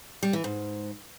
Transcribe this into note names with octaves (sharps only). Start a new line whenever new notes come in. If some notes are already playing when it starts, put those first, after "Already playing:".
G3
E3
G#2